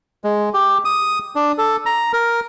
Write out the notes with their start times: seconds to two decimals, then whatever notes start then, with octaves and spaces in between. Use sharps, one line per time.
0.24 G#3
0.54 G4
0.85 D#6
1.35 D4
1.58 A4
1.86 A#5
2.13 A#4